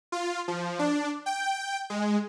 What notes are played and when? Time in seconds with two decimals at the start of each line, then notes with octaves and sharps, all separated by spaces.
0.12 F4
0.48 F3
0.79 D4
1.26 G5
1.90 G#3